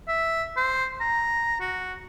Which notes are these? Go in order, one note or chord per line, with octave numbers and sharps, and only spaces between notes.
E5
C5
A#5
F#4